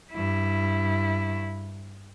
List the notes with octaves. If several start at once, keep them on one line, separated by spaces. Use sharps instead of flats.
G2 E4